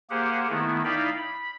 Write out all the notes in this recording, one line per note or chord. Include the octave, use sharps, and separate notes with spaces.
A#3 G4 G#4 C5 F#5
D#3 A3 B3 E4
D#4 E4 D5 F5 G5 B5
B5